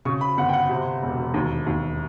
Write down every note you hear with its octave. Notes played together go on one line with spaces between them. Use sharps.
C#3 C#6
B5
G1 F#5
G5
F#5
C3
E1
D#2
D#2